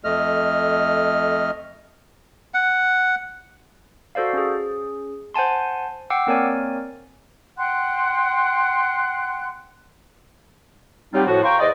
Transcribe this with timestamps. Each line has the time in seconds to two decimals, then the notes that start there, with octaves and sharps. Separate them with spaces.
0.04 F2 A3 D#5 F6
2.54 F#5
4.15 F#4 A4 C5 D5 F5
4.33 C#4 G#4
5.34 C5 F#5 G#5 A5 C6
6.10 F#5 G5 D6 E6 C7 C#7
6.27 A#3 C4 A#4 C#5 D5 G#5
7.57 F#5 G5 C6 F#6
11.14 F#3 G3 C4 D#4 F4 G4
11.27 A2 F3 F#4
11.43 F5 G5 A#5 C6 C#6
11.59 E2 C5 D5 D#5